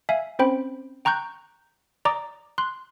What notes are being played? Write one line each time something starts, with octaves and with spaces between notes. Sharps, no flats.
E5 F5 G#5
C4 C#4 C5 G5 B5
G5 A#5 C#6 F#6 G6
D5 A#5 D6 D#6
C6 F#6